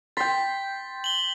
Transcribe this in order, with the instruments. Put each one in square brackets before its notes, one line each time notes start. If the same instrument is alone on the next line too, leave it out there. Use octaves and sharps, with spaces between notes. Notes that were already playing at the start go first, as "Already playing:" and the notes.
[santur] G5 C6 [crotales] A6 B6
[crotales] F#7 G7